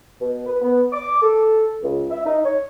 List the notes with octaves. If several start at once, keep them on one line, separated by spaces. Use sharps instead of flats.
B2
B4
B3
D6
A4
C#2
E5
D#4
C#5